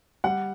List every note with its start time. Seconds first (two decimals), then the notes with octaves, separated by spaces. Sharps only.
0.24 G3 F#5